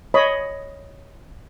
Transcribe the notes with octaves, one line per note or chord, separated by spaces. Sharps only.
C#5 D#5 B5